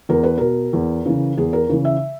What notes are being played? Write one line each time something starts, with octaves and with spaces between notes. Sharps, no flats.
E2 A#4
B4
B2 A#4
E2
C#3 E3
E2 G#4
A#4
C#3 E3
E5